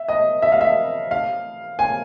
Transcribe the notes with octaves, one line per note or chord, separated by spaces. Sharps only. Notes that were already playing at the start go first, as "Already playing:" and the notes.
Already playing: E5
D#5
E5
F5
E5
F5
G#5